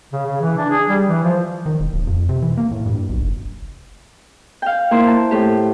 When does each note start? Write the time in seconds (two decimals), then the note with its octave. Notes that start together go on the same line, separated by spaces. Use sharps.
0.13 C#3
0.26 C#3
0.41 E3
0.58 D4
0.70 G#4
0.89 G3
1.08 E3
1.24 F3
1.66 D#3
1.80 E1
1.93 D1
2.07 F2
2.29 C3
2.42 E3
2.57 A#3
2.71 A2
2.86 G2
3.09 B1
3.21 F#1
4.62 F5 G5
4.91 A#3 E4 C5
5.07 A5
5.31 A2 G4